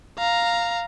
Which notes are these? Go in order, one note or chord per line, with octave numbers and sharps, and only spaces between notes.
F5 A#5